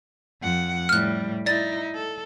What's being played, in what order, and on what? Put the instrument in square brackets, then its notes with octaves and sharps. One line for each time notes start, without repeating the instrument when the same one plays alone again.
[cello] F2 F#5
[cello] A2 G3 [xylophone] F6 F#6
[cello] D#4 E4 [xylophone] D5 A6
[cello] A4